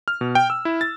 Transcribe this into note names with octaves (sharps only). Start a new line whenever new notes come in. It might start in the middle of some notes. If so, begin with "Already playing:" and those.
F6
B2
G5
E6
E4
A6